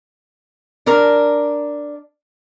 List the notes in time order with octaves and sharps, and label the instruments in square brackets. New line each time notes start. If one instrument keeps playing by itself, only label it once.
[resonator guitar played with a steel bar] D4 A#4